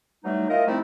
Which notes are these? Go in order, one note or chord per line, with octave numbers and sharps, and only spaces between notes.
E3 F#3 G3 A3 D#4
E4 F4 A#4 D#5
F3 G3 A3 C4 D#4 E4